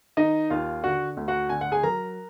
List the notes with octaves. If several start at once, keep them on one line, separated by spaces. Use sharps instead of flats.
D#3 D#4 D#5
D#2 F4 F5
D3 F#4 F#5
D2
F#4 F#5
D3 G#5
F#5
G#4 G#5
F#3 A#4 A#5